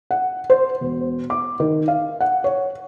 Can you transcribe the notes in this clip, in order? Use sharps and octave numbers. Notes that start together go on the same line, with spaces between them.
F#5
C5
E1
D6
D#3
F5
F#5
C#5